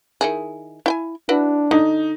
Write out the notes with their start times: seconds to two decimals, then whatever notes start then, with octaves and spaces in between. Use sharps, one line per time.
0.21 D#3 E4 G#4
0.86 E4 G5 G#5
1.29 D4 E4 F#4 B4
1.71 D3 D#4